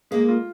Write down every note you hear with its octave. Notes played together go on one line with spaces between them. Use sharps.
G#3 A#3
F4